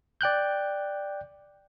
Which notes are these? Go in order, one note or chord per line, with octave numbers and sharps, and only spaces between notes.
D5 G5 F#6 G6